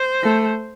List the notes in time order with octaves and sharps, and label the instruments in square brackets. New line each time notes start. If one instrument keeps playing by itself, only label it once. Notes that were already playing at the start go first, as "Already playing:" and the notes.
Already playing: [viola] C5
[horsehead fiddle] A3